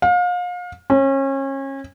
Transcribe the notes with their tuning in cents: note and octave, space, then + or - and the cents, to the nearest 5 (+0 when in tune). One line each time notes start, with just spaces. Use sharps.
F5 +35
C#4 -30